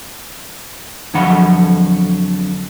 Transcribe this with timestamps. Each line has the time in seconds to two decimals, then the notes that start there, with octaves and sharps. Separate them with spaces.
1.14 F2 D3 F3 F#3 F#5 B5